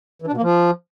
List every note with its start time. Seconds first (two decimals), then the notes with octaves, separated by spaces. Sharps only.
0.22 E3
0.27 D4
0.32 B2
0.37 A#3
0.42 F3